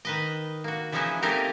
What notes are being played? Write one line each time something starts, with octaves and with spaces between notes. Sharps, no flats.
D#3 B4 D#5
A#3 F#4
E3 F3 G#3 C#4 D#4 E4
A3 A#3 C4 D#4 G4 A#4